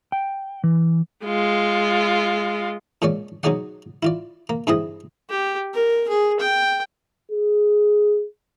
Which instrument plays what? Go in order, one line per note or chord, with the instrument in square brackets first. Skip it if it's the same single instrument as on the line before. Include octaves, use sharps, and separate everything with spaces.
[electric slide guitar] G5
E3
[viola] G#3 F4
[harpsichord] A#2 G#3 C#4 C#5 D5
B2 F#3 D#4 G#4 D5 F#5
E4 F4 D5
A#3
G2 E3 C4 E4 G#4 D#5
[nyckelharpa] G4
A#4
G#4
G5
[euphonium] G#4